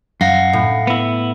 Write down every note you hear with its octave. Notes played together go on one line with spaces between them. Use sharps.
F#2 F5 F#5 A#6
A2
B3 E4